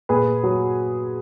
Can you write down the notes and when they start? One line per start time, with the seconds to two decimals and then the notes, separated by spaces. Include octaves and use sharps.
0.09 A#2 G#4 B4
0.43 F#3